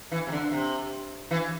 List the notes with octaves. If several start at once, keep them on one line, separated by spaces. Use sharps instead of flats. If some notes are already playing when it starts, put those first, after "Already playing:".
E3
C3
D3
C3
E3